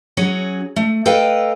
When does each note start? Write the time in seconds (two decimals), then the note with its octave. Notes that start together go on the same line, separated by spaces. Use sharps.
0.17 F#3 C#4 F#4 G#4
0.76 A3
1.06 A4 B4 D#5 F5 G5